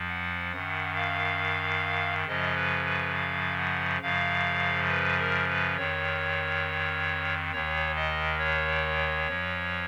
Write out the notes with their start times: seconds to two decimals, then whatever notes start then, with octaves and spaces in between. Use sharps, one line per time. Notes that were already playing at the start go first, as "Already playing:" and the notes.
Already playing: F2 F3
0.09 F#5
0.52 F#2 D#3 F#5
0.96 F5
2.27 F#2 C#3 F3 D#5
2.56 B4
2.85 B4
3.14 F5
3.58 F#5
4.02 F#2 C#3 F3 F5
4.89 B4
5.19 A#4
5.48 B4
5.77 F2 D#3 C#5
7.51 D#2 D#3 C#5
7.96 D#5
8.39 C#5
9.27 F2 F3